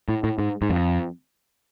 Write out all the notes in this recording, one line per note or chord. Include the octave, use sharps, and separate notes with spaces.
A2
A2
G#2
G#2
F2